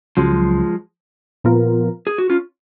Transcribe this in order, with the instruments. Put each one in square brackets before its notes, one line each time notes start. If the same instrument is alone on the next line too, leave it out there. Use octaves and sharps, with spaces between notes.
[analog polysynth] C#2 C#3 F#3 [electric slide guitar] F3 G#3
[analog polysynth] A#2 F3 B3 F4 A#4
[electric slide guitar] G#4
F#4
C#4 F4